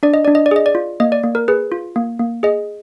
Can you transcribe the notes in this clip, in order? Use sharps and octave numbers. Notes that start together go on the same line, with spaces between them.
D4 D5
D#5
D4 D5
D#5
D5
G#4 D#5
D5
F4
A#3 D#5
D5
A#3
A#4
G#4 B4
F4
A#3
A#3
G#4 D#5